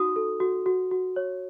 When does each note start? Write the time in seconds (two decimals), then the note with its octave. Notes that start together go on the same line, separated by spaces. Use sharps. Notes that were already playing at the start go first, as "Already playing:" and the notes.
Already playing: D#4 F#4 D#6
0.16 A4
0.40 F#4
0.66 F#4
0.91 F#4
1.16 C#5